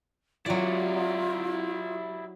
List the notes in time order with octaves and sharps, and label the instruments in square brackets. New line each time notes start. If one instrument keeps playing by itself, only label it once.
[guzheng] F#3 D5 [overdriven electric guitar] E4 G4 [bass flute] F4